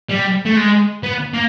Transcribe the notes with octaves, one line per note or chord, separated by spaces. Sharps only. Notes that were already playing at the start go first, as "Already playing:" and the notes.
G3
A3
G#3
B3
A#3